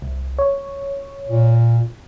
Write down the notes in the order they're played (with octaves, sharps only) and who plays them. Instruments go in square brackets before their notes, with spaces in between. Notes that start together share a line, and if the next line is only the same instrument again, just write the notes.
[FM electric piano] C2
C#5
[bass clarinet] A#2